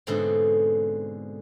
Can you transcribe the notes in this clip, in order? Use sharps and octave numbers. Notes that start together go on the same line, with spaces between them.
G#2 B2 D3 A3 C4